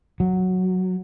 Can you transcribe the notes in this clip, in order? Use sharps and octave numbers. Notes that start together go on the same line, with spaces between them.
F#3